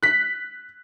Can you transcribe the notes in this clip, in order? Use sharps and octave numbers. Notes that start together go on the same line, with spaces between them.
F#6 B6